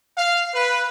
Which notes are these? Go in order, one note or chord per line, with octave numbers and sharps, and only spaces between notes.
F5
B4